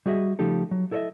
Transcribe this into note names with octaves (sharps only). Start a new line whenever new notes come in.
G3 F#4 G#4 D#5 E5
C#3 F3 A3 D#4 G4 A4
F#3
E4 A4 A#4 C#5 D#5 E5